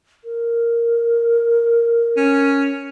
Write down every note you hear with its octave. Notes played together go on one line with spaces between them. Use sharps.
A#4
C#4